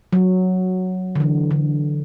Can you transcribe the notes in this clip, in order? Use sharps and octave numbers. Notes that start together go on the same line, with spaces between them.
F#3
D3
E3
D3